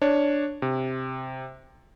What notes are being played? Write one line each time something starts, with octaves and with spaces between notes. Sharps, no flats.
D4 C#5
C3